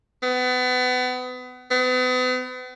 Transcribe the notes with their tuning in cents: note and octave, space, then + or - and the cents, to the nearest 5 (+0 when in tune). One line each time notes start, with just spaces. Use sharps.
B3 +30
B3 +40